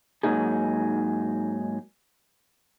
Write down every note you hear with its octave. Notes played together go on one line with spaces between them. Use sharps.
G#2 D#3 F#3 A#3 D#4 G#4